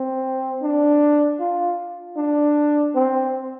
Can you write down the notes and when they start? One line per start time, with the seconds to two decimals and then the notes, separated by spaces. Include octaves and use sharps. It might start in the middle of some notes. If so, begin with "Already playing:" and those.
Already playing: C4
0.63 D4
1.40 F4
2.17 D4
2.95 C4